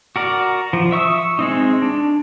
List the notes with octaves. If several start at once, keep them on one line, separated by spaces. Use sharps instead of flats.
F#4 A#4 D5
F3
E5 C#6 D#6 E6
G#3 C4 D#4
D4